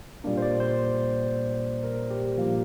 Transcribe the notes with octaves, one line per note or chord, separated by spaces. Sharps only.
A#2 G3 A#3 D4
C5
D5
C5
A#4
G4
A#2 F3 A#3